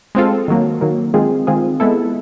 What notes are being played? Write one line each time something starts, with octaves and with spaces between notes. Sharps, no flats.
G#3 C4 F4 A4
D#3 F#3 A#3
D#3 F#3 A#3
D#3 G#3 C4 F4 G#4
D#3 G#3 C4 F4 G#4
G#3 B3 E4 A4